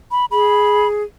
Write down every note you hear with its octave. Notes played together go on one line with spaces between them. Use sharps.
B5
G#4 B5